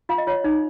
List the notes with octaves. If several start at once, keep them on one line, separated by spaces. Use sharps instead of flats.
F4 F5
D#5
F4 C#5
D#4